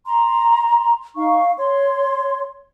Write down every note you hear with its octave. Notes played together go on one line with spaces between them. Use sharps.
A#5 C6
D#4 F5 C#6
C#5 C6